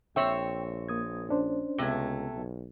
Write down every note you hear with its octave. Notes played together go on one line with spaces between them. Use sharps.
A#1 C4 C#5 E5 G5
A#3 D#6 G#6
C#4 D4 C5
C#2 C3 A3 B3 G#6
B1